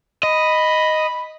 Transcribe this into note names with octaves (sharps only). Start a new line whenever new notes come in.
D#5 B5